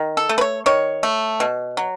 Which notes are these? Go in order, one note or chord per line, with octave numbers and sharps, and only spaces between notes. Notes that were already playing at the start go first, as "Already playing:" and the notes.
Already playing: D#3
A4
A3
B4
C#5
D#3 C#5
A3
B2
F#3